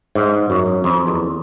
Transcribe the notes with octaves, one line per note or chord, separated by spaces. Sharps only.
G#2
F#2
F2
E2